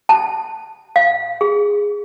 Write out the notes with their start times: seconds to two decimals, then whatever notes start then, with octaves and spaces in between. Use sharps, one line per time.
0.09 A5
0.96 F5
1.41 G#4